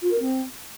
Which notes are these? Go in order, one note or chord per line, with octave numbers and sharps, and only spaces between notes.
F4
A#4
C4